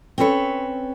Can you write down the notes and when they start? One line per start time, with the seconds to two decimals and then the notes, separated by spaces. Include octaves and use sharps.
0.18 C4 C#4 A4 B4 C#5